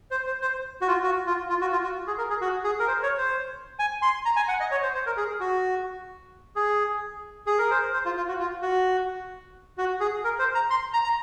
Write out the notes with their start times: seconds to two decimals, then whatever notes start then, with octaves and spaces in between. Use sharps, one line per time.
0.11 C5
0.27 C5
0.41 C5
0.81 F#4
0.88 F4
1.04 F#4
1.26 F4
1.49 F4
1.61 F#4
1.72 F4
1.84 F#4
2.07 G#4
2.18 A#4
2.30 G#4
2.41 F#4
2.64 G#4
2.79 A#4
2.88 C5
3.03 C#5
3.18 C5
3.79 G#5
4.02 C6
4.25 A#5
4.36 G#5
4.48 F#5
4.60 D#5
4.71 C#5
4.83 C5
4.94 C5
5.06 A#4
5.17 G#4
5.40 F#4
6.56 G#4
7.47 G#4
7.58 A#4
7.71 C5
7.93 C5
8.05 F4
8.17 F4
8.28 F#4
8.39 F4
8.62 F#4
9.78 F#4
10.00 G#4
10.24 A#4
10.39 C5
10.55 A#5
10.70 C6
10.93 A#5
11.04 A#5